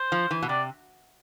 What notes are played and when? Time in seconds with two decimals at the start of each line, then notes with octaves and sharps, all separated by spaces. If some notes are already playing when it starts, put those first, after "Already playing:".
Already playing: C5
0.12 F3
0.31 E3
0.42 B2
0.49 C3 D5